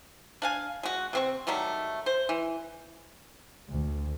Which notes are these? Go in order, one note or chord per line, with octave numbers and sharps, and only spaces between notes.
D4 F5 G#5
G#3 F#4
C3 C4 C#6
D#3 F#3 G3 A3
C5
E3
D2